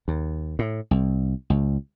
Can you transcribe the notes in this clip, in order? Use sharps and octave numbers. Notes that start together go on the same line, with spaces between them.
D#2
A2
C2
C#2